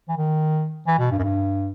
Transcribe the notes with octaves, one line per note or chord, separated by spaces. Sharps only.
E3
D#3
E3
B2
G2
F#2
G2